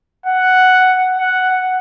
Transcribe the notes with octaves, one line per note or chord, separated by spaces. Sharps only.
F#5
F#5